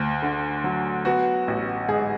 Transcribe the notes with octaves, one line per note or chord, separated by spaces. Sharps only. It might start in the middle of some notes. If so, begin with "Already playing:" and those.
Already playing: D2
D3
F#3
B3 F#4
A1
G#2 G#4